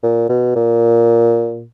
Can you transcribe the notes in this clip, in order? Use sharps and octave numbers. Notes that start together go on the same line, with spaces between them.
A#2
B2
A#2